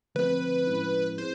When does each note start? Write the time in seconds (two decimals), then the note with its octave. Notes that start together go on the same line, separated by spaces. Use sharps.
0.15 D3 F3 A3 C4 B4
0.67 A2 F3 G#3 C#4 E4
1.17 C4 E4 G#4 C5